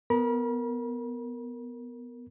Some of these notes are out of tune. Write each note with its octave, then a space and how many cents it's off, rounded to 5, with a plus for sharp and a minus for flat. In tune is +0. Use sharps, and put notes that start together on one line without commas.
B3 +0 A#4 -10 B5 -40